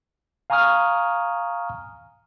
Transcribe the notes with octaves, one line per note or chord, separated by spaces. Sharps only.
F5 G#5 A#5 C#6 D#6 F6